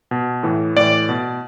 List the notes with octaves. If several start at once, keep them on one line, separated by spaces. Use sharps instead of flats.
B2
A2 E3
A2 E3 D5
B2